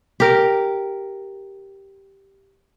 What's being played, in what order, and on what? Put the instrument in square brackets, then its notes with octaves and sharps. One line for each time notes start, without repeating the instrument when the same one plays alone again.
[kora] G4 A#4